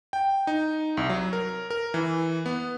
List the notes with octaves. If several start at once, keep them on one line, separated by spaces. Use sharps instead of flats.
G5
D#4
C2
F#3
A#4
A#4
E3
B3